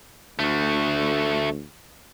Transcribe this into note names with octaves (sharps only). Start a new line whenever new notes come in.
D2 A3 F#4